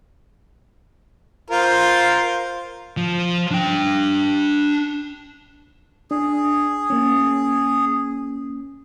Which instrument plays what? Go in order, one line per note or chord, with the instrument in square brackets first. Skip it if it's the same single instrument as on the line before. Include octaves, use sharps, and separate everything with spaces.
[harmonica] F4 A#4 C5
[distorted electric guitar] F3
D4 G5
[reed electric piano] D4 [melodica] G#4
[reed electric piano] A#3 C#4